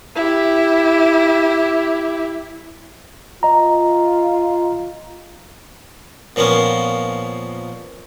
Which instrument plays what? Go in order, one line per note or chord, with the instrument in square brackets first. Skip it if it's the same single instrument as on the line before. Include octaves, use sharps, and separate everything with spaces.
[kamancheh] E4 G4
[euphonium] F4 [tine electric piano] D#5 A#5
[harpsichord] A#2 F3 A#3 B3 C#4